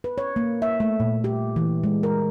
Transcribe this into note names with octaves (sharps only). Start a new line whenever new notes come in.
B4
C#5
A#3
E5
A3
A#2
G4
E3
G#3
A#4